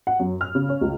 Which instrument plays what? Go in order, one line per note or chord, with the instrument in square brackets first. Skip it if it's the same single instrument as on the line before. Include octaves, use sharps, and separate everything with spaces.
[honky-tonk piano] F#5
F#2
F6
C#3
C#4
C#2